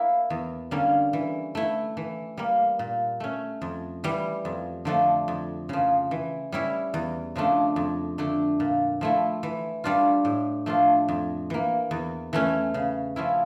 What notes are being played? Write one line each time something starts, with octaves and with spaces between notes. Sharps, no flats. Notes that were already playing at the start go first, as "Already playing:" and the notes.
Already playing: A#3 E4
E2
D3 G3 A#3 C#4
E3
A3 E4
E3
G3 A#3
A#2
A3 C#4
F2
E3 G3
F2
D3 F3 A3 D4
F2
C#3 F3
E3
G3 C#4 E4
E2
C#3 F3 A3 D4
F2
D3 A3 D4
A#2
F3 A3 E4
E3
G3 D4 F4
A2
F3 A3 D4 F4
F2
E3 A#3
E2
E3 A3 C#4
C#3
F3 C#4 E4